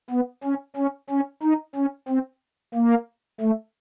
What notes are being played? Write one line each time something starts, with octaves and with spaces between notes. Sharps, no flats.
B3
C#4
C#4
C#4
D#4
C#4
C4
A#3
A3